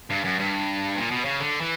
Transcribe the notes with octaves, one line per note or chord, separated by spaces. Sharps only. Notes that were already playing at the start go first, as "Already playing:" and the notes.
G2
F#2
G2
A#2
B2
C#3
D3
E3